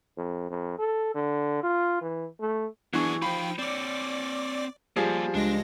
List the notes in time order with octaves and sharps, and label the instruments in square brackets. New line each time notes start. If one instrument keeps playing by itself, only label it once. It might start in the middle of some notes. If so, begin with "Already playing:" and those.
[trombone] F2
F2
A4
D3
F4
E3
A3
[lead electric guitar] F#2 G#4 [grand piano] E3 C#6 [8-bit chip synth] B3 D4
[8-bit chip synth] F3 G5 [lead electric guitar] D#4 F5 [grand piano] B5
[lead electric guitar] C4 C#5 [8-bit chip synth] D5 D6
[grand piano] F3 G3 G#4 [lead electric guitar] A#3 G4
[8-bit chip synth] C#2 G#3 A#6 [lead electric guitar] D4